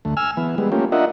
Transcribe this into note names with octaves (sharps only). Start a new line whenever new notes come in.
D2 A3
G#5 E6 F6
E3 B3
G3 G#3 B3
A3 A#3 C#4 F4 G4
D4 F4 A#4 D#5 E5 F#5